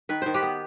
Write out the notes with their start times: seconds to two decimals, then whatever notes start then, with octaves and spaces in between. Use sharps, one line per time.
0.09 D#3 B4
0.22 D#3 C5
0.34 G4 B4
0.43 B3